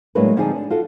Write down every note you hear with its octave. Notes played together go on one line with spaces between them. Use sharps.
A2 F#3 G#3 A#3 D4 B4
D3 F3 C4 D#4 F4 G#4
D4
F4 F#4 A4